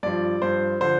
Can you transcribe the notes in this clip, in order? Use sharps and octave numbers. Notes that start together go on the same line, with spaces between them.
G2 F3 D5
G2 F3 C5
D3 F3 C5